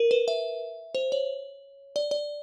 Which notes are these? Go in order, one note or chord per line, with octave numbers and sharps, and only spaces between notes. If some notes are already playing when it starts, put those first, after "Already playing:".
Already playing: A#4
B4
E5
C5
C#5
D5
D5